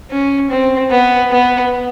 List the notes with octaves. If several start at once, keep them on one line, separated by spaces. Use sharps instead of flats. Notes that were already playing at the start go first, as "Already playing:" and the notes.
C#4
C4
B3
B3